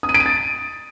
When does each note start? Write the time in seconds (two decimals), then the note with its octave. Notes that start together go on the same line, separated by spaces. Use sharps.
0.03 D#6
0.09 D#7
0.14 D7
0.20 D#7
0.26 A6